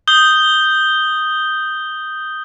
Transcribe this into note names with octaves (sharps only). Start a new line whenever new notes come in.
D#6 G6 G7